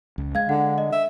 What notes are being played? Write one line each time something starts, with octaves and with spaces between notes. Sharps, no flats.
C#2
G#3 F5 G#6
D3 F#5
D#5
E5